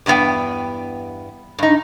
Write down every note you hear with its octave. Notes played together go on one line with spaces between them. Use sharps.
E2 G2 C3 B3 G5
G2 D#4